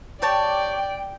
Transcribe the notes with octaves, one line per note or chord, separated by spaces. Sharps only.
G4 C#5 D5 G5 A5